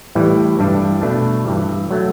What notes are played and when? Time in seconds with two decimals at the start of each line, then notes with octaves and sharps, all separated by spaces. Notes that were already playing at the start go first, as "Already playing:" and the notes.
0.15 A2 E3 G3
0.59 G2 E3 G3 D4
1.01 B2 A3 D4
1.45 G2 E3 G3
1.91 F#3 A3